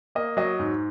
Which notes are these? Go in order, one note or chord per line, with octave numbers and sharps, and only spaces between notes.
A#3 D#5
F#3 D#5
G#2